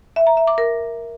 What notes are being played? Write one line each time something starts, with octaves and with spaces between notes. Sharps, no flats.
E5
A#5
E5
D6
A#4